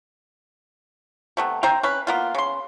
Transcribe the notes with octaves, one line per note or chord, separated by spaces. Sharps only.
C3 A3 B3
C4 C5 G5 A#5
C#4 B4
A#3 B3 F4
C#3 C6